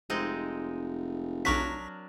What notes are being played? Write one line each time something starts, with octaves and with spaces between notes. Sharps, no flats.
F1 G#3 C4 D#4
B1 F#3 D4 A#4 C#6 B6